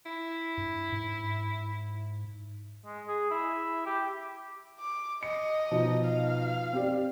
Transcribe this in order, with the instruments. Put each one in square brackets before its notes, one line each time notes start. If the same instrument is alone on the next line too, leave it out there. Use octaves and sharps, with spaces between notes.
[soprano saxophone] E4
[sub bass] G2
G#2
[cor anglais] G#3
G#4
E4
G4
[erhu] D6
[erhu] D#5 [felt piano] C#7
[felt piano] B2 F3 D#4
[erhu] F5
[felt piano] C4 G4 D5